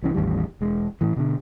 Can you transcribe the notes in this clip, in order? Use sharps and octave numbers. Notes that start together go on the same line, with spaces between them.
C2 E3 C#4
A1 E2 D#3 G3
E1 G#3
A2 E3
B2 D3